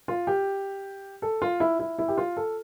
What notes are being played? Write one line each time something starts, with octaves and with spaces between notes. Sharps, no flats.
F4
G4
A4
F4
E4
E4
E4
G4
F4
A4